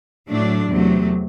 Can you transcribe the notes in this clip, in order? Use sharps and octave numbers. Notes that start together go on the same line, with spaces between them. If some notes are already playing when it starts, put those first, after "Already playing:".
A2 F#3 A3 D4
E2 C3 F#3 A3